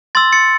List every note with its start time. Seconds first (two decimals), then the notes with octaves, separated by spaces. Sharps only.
0.15 C6 E6 A6
0.33 A6 C#7